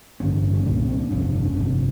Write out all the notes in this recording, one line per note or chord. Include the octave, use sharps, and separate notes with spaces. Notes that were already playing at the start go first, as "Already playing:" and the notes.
A1 G2 D3 C#4
D4
C#4
C#4
C2 A#2 D4
C#4
C4
D4
G1 F2 C3 C#4
D4
D4
C#4
G1 F2 C3 D4